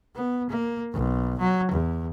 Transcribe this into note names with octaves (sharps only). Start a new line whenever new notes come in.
B3
A#3
B1
F#3
E2